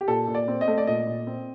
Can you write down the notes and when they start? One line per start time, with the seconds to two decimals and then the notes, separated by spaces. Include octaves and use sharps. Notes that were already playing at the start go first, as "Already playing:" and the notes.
0.01 G4
0.08 A#2 A4
0.28 A#2
0.35 D5
0.48 C4
0.61 D#5
0.68 A3
0.78 D5
0.87 A#2 D#5
1.07 A#2
1.27 C4